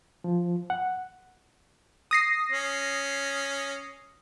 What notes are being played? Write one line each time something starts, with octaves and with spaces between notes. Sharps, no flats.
F3
F#5
D#6 A#6 C7
C#4